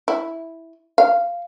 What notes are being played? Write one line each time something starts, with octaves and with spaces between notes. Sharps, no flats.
E4
F5